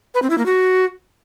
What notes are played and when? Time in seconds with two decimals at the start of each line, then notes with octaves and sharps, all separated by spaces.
0.14 B4
0.22 C4
0.30 E4
0.38 A#3
0.46 F#4